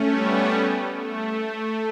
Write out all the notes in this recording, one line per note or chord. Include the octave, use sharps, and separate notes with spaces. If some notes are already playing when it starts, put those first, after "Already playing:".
Already playing: A3 C#4
G3 B3
A3